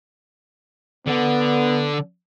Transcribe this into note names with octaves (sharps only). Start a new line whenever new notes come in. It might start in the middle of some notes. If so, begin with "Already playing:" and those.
D3 B3